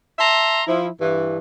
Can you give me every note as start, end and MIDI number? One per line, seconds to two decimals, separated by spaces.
0.19 0.61 76
0.19 0.61 81
0.19 0.61 82
0.19 0.61 84
0.67 0.87 53
0.67 0.87 64
1.00 1.39 43
1.00 1.39 52